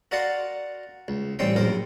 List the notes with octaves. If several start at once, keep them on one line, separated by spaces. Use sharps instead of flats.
F#4 A#4 D5 F5 F#5 C6
C#2
A1 G3 C4 C#4 G5 C6
A#1 F#2 A#3 C5 F5